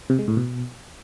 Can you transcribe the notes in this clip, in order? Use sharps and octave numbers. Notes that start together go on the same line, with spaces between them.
C3
G#3
A2
B2